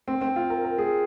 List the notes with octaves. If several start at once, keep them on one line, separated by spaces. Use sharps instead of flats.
C4
C4
F4
A#4
A#4
G#4